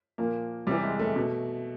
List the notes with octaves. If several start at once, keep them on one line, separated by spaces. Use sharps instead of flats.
A#2 F3 A#3
C3 E3 G3
G#3
A3
B2